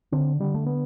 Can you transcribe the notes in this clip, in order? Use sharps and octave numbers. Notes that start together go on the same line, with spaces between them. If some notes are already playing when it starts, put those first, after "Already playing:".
D3 C4
D3 G3
A3
B3